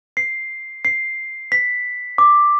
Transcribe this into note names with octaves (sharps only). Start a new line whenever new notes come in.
C7
C7
B6
D6